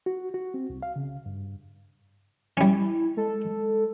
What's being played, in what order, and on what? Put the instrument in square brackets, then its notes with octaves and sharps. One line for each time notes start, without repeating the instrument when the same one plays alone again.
[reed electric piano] F#4
F#4
C4
C2
F5
C#3
G2
[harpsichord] G3 C#4 [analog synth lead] E4
[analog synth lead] G#3 [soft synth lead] A4